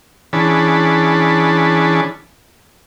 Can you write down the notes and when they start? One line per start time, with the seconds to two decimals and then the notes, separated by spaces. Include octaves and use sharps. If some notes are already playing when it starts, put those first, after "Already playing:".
0.33 E3 C#4 D4 G#4 A5 B5